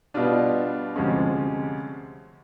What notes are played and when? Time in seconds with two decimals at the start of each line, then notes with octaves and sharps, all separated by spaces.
0.14 B2 G3 B3 D4 F4
0.96 D2 C3 F3 G#3 C#4